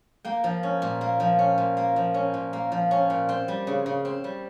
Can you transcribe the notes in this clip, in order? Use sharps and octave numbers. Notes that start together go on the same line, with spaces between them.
A#3 G5
F3
C#4
A#2
A#3
F3
C#4
A#2
A#3
F3
C#4
A#2
A#3
F3
C#4
A#2
C4 G5
G3
C#3
C#3
C4
G3